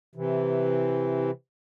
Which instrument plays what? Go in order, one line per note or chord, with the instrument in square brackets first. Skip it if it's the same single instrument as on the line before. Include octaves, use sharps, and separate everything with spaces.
[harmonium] C3 E3